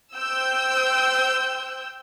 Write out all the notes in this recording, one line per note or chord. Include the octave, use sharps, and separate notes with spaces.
C5 G5 E6 G6